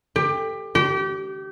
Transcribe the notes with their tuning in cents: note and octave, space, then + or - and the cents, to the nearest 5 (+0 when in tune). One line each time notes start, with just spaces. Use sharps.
G4 +20
G4 -30